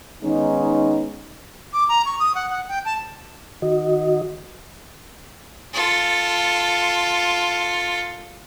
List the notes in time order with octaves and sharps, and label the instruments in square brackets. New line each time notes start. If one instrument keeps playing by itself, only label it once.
[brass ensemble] D#3 G#3 B3 C#4 D#4
[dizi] D6
A#5
C#6
D#6
F#5
F#5
G5
A5
[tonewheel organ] D#3 F#4 D#5
[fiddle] F4 A4